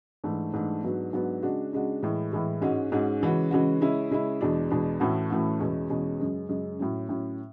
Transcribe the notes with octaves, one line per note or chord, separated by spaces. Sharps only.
G#2 E3 A3 D4
G#2 E3 A3 D4
G#2 F#3 B3 D4 F#4
G#2 F#3 B3 D4 F#4
C#3 G#3 D4 F#4
C#3 G#3 D4 F#4
A2 E3 G#3
A2 E3 G#3
G#2 G#3 C#4 F#4
G#2 G#3 C#4 F#4
C#3 E3 G#3 C#4 F#4
C#3 E3 G#3 C#4 F#4
C#3 G#3 C#4 E4
C#3 G#3 C#4 E4
E2 B2 G#3 D4
E2 B2 G#3 D4
A2 E3 A3 C#4 F#4
A2 E3 A3 C#4 F#4
E2 B2 G#3 C#4
E2 B2 G#3 C#4
F#2 C#3 G#3
F#2 C#3 G#3
A2 F#3 C#4
A2 F#3 C#4